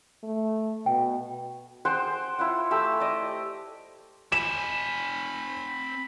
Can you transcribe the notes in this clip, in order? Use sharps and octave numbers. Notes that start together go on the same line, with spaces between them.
A3
B2 G5
G#4 C5 F#5 G5
E4 F4 F#5
A3 G4 E6
D5 D#5
C4 G#5 B5 E7